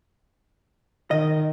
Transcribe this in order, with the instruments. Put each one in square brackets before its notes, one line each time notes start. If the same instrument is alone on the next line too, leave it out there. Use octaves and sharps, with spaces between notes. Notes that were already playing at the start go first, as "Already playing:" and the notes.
[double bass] D#3 [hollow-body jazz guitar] D#5